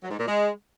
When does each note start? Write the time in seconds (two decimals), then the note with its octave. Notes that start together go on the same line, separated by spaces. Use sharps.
0.01 F#3
0.10 G#2
0.18 A#2
0.26 G#3